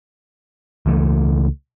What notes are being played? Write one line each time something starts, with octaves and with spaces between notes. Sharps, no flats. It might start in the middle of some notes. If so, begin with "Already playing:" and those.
C#2 E3 A3